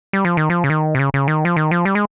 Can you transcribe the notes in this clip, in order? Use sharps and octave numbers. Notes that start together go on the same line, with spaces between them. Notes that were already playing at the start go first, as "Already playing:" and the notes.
G3
F3
D#3
F3
C#3
D#3
C3
C#3
C#3
D#3
F3
D#3
F3
G3
G#3